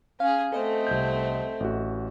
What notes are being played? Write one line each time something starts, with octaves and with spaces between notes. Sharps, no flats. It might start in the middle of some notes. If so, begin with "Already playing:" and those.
C#4 G#4 F5
A3 C4 A4 D#5
C2 G6
A1 F#4